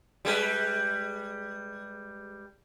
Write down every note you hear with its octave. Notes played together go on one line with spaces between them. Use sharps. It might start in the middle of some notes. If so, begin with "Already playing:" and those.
G3 G#3 B4